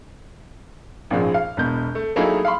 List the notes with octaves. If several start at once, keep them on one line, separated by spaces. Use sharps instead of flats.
G#1 F#2 A#2 F3 G#3
F5
E1 B2 G6
A3
F#3 A3 A#3 D#4 E4 G#4
F5 B5 C6